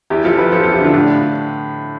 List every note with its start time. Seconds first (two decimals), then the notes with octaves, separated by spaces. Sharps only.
0.10 E2 E4 G4
0.24 F3 F4 A4
0.38 F3 G4 B4
0.52 F3 A4 C5
0.63 E2 F4 A4
0.73 E4 G4
0.80 D3 D4 F4
0.94 A2 D4 F4